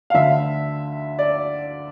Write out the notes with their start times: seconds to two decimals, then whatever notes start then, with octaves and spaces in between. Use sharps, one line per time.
0.10 F5
0.14 D2 D3 E5
1.19 D5